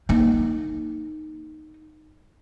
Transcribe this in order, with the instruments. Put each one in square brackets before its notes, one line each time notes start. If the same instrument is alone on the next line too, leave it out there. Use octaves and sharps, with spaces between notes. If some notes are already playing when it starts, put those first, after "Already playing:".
[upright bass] A#3 D#4